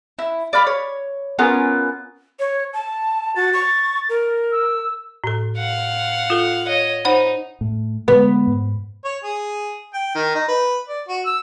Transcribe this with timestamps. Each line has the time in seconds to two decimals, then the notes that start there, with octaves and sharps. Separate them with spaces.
0.19 E4
0.53 D5 F5 B5
0.67 C#5
1.39 B3 C#4 F4 A#4
2.40 C#5
2.73 A5
3.36 F#4 A6
3.53 C#6
4.09 A#4
4.52 E6
5.24 A2 A4
5.57 F5 F#5
6.30 F4 A4
6.68 C#5 D#5
7.05 D#4 C5 F#5 B5
7.61 A2
8.08 D3 G#3 B3
8.47 G#2
9.05 C#5
9.24 G#4
9.94 G5
10.15 D#3
10.35 D#4
10.48 B4
10.88 D5
11.08 F#4
11.26 E6